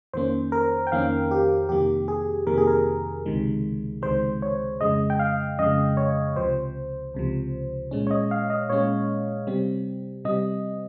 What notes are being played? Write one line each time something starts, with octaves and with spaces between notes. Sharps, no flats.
F2 D#3 A#3 C#4 C5
A#4
G5
F2 D#3 A#3 C#4 F5
G4
F2 C3 D#3 A#3 G4
G#4
F2 C3 D#3 A#3 A#4
G#4
A#4
C#2 C3 D#3 G#3
C#2 C3 D#3 G#3 C5
C#5
F2 C#3 G#3 D#5
G5
F5
F2 C#3 G#3 D#5
C#5
C#2 C3 F3 C5
C#2 C3 F3
A#2 G#3 C#4
C#5
D#5
F5
D#5
A#2 G#3 C#4 C#5
C3 G3 C4
C3 G3 C4 D#5